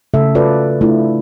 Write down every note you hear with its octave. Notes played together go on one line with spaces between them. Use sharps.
C#3 A3 A4 E5
F4 F#4 A4 B4 D5
A3 D4 E4 F4